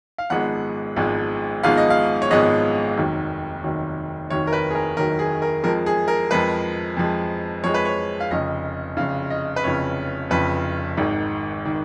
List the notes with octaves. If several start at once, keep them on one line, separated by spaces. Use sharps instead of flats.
F5
G#1 G#2 F3 G#3 B3 F#5
G#1 G#2 F3 G#3 B3
G#1 G#2 F3 G#3 B3 F5
D#5
F5
C#5
G#1 G#2 F3 G#3 B3 D#5
F1 D#2 D#3 F#3
F1 D#2 D#3 F#3
F1 D#2 D#3 F#3 C#5
A#4
B4
G#4
A#4
F1 D#2 D#3 F#3 A#4
G#4
A#4
F2 F3 G#3 A#4
G#4
A#4
F2 F3 G#3 B4
F2 F3 G#3
F2 F3 G#3 C#5
B4
C#5
F5
F1 F2 C#3 D#5
F1 F2 C#3 F5
D#5
B4
F1 F2 C#3 C#5
F1 F2 C#3 B4
G#1 G#2 D#3
D#3